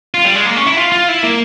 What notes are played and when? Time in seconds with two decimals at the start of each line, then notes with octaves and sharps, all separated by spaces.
0.14 F4
0.25 G3
0.35 G#3
0.46 A#3
0.56 C#4
0.66 E4
0.77 F4
0.92 F4
1.08 E4
1.23 A#3